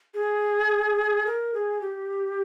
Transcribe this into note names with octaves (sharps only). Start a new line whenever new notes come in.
G#4
A#4
G#4
G4